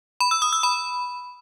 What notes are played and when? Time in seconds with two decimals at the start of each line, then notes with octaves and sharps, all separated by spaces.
0.20 B5
0.31 E6
0.42 D#6
0.53 E6
0.63 B5